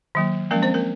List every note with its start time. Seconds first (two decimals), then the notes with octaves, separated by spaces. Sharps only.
0.15 D#3 F#3 A#3
0.51 F3 G#3 A#3 C#4 A#4
0.62 C4 C5
0.74 A#3 A#4